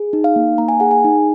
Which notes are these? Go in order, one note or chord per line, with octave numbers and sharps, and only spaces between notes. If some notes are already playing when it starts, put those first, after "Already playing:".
Already playing: G#4
D#4
F5
A#3
A#3 A#5
G#5
G#4 F#5
G#5
D#4